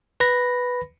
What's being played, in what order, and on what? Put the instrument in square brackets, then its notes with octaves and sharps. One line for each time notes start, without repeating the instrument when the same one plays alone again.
[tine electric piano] B4 B5 A#6